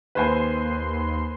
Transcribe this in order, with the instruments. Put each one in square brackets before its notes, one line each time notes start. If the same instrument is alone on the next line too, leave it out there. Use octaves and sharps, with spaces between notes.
[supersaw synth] D#2 C6 [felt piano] B4 C5 G#5